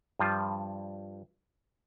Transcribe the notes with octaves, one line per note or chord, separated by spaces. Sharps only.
G2 F3 G3 F4